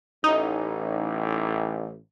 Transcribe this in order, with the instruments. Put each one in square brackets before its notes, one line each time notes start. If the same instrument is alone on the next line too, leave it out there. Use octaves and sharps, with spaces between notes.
[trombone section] A1 [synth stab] D#4